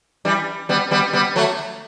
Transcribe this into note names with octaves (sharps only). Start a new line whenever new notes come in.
E3 G3
G3 B3
G3 B3
G3 B3
F#3 A3